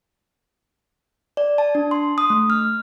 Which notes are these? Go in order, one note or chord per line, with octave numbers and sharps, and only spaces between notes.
D5
A5
D4
C6
D#6
A3
F6